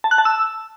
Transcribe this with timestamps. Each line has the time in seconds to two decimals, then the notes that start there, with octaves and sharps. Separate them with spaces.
0.04 A5
0.11 F#6
0.18 A5
0.25 E6